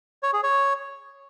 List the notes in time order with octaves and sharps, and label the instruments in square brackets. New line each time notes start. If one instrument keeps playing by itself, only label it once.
[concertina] C#5
G#4
C#5